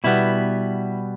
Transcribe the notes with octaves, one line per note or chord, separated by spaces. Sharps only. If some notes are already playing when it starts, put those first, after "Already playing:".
B2 G3 B3 E4